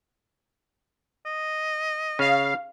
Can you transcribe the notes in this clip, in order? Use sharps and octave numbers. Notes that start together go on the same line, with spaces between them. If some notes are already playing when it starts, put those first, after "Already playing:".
D#5
C#3 F5